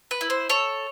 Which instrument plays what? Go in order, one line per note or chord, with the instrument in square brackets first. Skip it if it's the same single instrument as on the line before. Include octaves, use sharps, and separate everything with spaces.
[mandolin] B4
E4
C5
A4 C#5